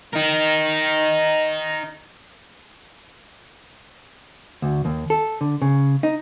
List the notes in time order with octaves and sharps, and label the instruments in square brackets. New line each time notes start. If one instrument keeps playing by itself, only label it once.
[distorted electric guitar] D#4 A#4
[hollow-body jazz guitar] D2
D#2
A4
D3
C#3
D#4